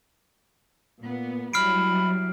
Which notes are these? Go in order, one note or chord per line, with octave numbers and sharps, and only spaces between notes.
A#2 B3
F#3 G3 E4 B5 F6 C7 D7